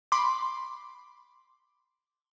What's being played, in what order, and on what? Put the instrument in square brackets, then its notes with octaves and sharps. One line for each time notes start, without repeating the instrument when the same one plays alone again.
[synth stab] B5 C6 D6